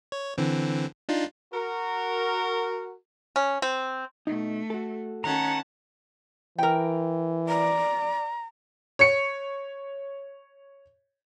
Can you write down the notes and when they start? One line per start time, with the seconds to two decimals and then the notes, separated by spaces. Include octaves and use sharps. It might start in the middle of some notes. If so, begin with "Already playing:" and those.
0.12 C#5
0.38 D3 E3 C4
1.09 D4 D#4 F4
1.53 F#4 A#4
3.36 C#4
3.62 C4
4.27 B2 A3 D#4
4.70 F#4 A4
5.24 D#3 C#4 F#5 A5 A#5
6.58 E3 A#4 G5
7.49 D5 A#5
8.99 C#5 C#7